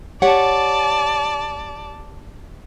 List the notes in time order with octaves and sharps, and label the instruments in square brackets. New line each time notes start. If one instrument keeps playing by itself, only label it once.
[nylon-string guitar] G4 C#5 F#5 [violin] D5 A5